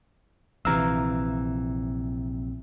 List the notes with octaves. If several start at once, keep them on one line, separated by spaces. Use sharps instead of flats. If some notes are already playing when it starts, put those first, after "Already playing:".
A#1 C3 E3 F5 A#5 E6